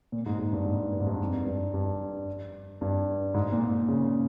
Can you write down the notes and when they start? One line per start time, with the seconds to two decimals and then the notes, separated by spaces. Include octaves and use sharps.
0.12 A#2
0.26 G#2
0.39 G#2
0.53 G2
0.66 G#2
0.93 G2
1.00 G#2
1.07 G2
1.21 F2
1.47 G2
1.74 G2
2.81 G2
3.34 G#2
3.52 A#2
3.88 C#3